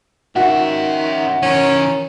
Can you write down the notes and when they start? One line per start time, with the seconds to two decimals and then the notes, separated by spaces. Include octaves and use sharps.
0.36 D#3 C#4 F#4 E5
1.43 E3 C#4 A#4